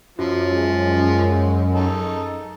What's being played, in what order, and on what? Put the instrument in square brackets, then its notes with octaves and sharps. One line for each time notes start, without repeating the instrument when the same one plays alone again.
[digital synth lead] F#2 [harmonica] F3
[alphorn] G#3
[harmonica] D#4 A4